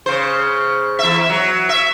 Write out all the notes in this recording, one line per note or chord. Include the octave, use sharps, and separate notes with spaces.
C#3 C5
E2 E5
F#3
E5